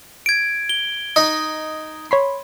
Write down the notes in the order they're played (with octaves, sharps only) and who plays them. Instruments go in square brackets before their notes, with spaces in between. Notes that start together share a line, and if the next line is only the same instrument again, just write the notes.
[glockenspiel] G#6 D7
G7
[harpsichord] D#4
[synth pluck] C#5 B5 C6